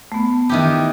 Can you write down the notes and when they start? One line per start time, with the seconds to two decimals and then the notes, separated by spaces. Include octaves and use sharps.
0.12 A3 B3
0.49 D#3 E3 G4